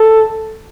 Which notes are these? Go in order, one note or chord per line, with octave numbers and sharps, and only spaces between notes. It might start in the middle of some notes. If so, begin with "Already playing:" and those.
Already playing: A4